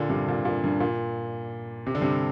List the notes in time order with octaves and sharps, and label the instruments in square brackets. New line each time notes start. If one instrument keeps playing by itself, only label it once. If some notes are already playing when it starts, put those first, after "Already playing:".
Already playing: [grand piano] A#2 D3
G2 C3
A#2
A#2
G2
A#2
C3
D3
G2 C3